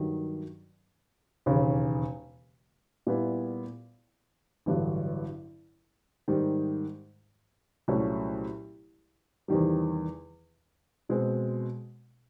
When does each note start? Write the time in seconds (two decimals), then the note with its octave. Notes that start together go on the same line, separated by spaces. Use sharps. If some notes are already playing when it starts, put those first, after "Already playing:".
Already playing: G2 D#3 F#3
1.46 E1 D#2 C#3
3.07 A#2 G3 B3 E4
4.66 A1 G2 D3 F#3
6.28 G#2 D#3 G3
7.88 C2 A#2 F#3 A3 C#4
9.48 E2 C3 D#3 G3
11.09 B2 G#3 C4